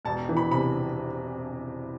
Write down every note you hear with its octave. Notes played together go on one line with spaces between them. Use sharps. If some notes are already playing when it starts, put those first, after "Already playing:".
E1 A5
E3
B5
C3 B5